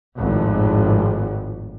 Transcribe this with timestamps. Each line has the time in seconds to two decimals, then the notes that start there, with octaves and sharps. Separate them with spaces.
0.17 G#1 F2 A2